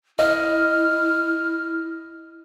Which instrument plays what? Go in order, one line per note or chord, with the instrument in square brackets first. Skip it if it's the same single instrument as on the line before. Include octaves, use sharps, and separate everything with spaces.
[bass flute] E4 [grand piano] D#5 [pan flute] F6